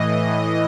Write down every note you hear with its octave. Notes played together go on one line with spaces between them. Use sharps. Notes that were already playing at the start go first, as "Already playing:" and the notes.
Already playing: A2 E3 D#5